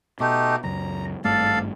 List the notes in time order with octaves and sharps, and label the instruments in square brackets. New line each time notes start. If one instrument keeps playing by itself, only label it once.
[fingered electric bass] B2 [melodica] A3 D#4 G4
[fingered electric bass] C#2 F#2 [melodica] A#5
[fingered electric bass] G#1 G2 A3 [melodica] A4 D5 F5